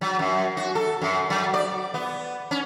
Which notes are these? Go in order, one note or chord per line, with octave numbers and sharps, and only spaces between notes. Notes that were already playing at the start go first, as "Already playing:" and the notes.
F#3
F#2
F#4
A4
F#2
F#3
D5
B3
C#4